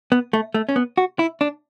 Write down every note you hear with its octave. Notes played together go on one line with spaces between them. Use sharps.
B3
A3
A3
C#4
B3
F#4
E4
D4